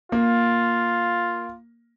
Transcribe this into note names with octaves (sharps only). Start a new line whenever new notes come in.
A#3 F4